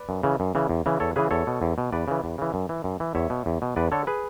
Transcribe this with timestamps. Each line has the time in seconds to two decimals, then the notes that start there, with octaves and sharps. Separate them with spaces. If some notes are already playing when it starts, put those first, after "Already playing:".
Already playing: B4 D5
0.09 F#2
0.23 C#3 E3
0.40 F#2
0.55 C#3 E3
0.69 E2
0.86 C#3 E3
1.00 E2 A4 C#5
1.16 C#3 E3 G#4 B4
1.31 E2 A4 C#5
1.47 B2
1.62 E2
1.78 B2
1.93 E2 B4 D5
2.08 C#3 E3
2.24 E2
2.38 C#3 E3
2.54 F#2
2.69 E3
2.84 F#2
3.00 E3
3.15 E2 C#5 E5
3.30 B2
3.46 E2
3.62 B2
3.76 E2 B4 D5
3.92 D3 A4 C#5
4.07 G#4 B4